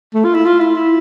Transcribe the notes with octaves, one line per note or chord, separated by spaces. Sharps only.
A3
F4
E4
F4
E4
E4